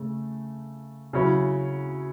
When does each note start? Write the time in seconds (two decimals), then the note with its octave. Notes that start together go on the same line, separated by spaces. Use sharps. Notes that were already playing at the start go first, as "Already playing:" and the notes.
Already playing: C#3 A3
1.13 C#3 F#3 C#4 E4